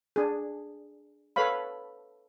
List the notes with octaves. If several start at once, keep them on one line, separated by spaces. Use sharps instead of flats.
D4 G#4
A4 B4 C#5 F5 B5